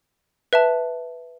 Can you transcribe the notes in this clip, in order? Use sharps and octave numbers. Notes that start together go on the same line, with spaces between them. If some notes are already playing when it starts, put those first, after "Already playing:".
B4 E5 A5